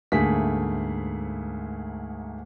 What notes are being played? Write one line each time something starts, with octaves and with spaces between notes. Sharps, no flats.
D2 G#2 A3 A#3 G#4 B6